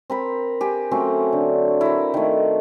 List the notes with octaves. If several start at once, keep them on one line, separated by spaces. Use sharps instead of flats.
C4 A#4 B5
G4 G#5
F#3 A3 C4 C#4
D3
E4 A#4
D#3 A3